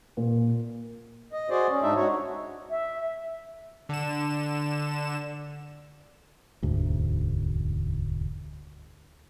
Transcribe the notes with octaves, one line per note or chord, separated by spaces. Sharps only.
A#2
D#5
F#4 G#4 C5 D5
C#4
G#2 G#3 D4 D#4 E5
F#4 C#5
E5
D3 E7
E1 D2 G#2